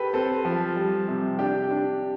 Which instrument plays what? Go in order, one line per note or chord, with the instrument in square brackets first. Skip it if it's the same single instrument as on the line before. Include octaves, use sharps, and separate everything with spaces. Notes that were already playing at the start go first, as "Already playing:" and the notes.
Already playing: [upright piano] G4 A4 B4
[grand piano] C4 [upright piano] A4
[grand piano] F3
G3
C3
[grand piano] D4 [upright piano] G4
[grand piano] D4